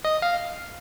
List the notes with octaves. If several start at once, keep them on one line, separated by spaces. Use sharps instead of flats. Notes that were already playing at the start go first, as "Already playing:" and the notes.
D#5
F5